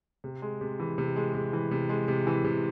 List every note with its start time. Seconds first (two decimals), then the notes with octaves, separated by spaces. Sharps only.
0.24 C3
0.42 G#3
0.61 C3
0.79 E3
0.98 C3
1.16 G#3
1.34 C3
1.53 E3
1.71 C3
1.89 G#3
2.08 C3
2.27 E3
2.44 C3